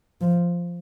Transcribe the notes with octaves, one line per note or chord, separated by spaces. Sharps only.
F3